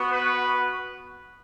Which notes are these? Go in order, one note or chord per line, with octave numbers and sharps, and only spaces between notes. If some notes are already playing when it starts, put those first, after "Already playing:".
Already playing: B3 F#4
B4